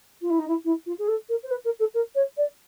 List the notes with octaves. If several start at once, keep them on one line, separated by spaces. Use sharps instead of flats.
F4
E4
D#4
E4
E4
F4
G#4
A4
A#4
C5
B4
A#4
A4
A#4
C#5
D5